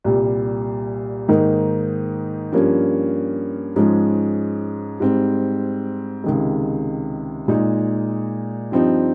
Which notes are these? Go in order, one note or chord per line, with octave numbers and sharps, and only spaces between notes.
C2 A#2 G3
G#2 D#3 A#3 D#4
G2 F3 A#3 C#4
G#2 F3 G#3 C#4
G#2 G3 C4
C#2 C3 D#3 G#3
A#2 G#3 D#4
G2 F3 C4 D#4